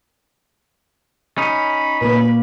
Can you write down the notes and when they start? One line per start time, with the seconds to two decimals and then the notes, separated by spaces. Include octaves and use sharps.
1.38 C#4 D#4 B5
2.01 A#2 A#3 B4